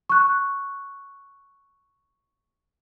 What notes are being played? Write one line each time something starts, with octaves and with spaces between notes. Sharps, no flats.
C#6 F#6